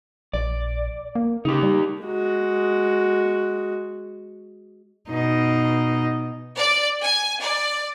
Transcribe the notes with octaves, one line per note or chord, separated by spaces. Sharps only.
A#1 D5
A#3
C#3 D#4 G4
G3
G#3 F#4
B2 D#4
D5
G#5
D5